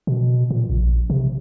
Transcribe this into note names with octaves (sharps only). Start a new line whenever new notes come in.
B2
A#2
A#1
C3